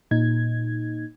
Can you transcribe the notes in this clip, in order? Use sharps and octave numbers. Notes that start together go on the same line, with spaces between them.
A#2 D#4 G#6